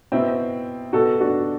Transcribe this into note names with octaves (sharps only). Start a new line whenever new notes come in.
B2 C4 E4
B2 F#4 A4
D4 F#4